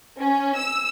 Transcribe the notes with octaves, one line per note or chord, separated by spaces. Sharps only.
C#4
E6